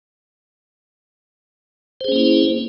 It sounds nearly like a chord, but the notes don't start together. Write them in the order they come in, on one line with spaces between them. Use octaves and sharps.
C5 G#4 C#4 A#3 E4